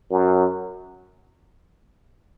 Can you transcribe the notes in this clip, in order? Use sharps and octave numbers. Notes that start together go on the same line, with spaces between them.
F#2